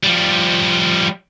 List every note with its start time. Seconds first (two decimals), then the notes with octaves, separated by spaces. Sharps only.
0.03 F3 G3